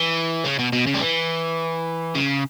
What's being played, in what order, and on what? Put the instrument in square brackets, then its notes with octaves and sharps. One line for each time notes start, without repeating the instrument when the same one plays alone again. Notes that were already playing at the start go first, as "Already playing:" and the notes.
Already playing: [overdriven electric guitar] E3
C#3
B2
B2
C#3
G3
E3
C#3